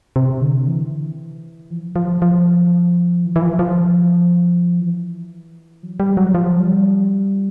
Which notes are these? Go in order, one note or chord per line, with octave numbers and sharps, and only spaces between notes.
C3
D3
E3
F3
F3
F3
E3
E3
F3
F3
E3
F#3
G3
F#3
F3
G3